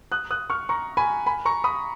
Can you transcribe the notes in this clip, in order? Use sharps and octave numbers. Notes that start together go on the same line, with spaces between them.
D#6 F#6
D#6 F#6
C#6 F6
A#5 C#6
G#5 B5
G#5 B5
A#5 C#6
B5 D#6